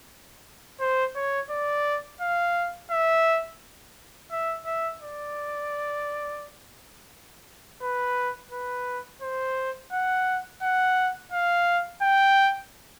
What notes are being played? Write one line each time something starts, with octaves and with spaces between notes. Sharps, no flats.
C5
C#5
D5
F5
E5
E5
E5
D5
B4
B4
C5
F#5
F#5
F5
G5